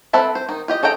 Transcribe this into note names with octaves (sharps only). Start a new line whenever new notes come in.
C4 A4 B4 E5 A5
C5
D#3 D#4
F4 G4 D#5
C#4 A4 D#5 G5 A#5